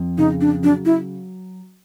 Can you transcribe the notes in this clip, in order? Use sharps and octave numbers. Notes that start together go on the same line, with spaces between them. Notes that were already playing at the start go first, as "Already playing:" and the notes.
Already playing: F2
C#3 D#4
D4
F#3 D4
E4